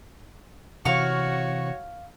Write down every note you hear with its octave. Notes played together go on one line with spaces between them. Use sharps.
C3 E3 F#4 C#5 F5 C#6